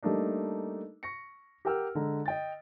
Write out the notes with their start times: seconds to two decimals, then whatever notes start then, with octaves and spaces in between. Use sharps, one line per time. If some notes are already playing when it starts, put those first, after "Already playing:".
0.03 G3 A3 A#3 D4 D#4
1.03 C#6 A#6 C#7
1.65 G4 A#4 F#5 G5 E6 F6
1.95 D3 G#3 A#5
2.26 D#5 G5 A6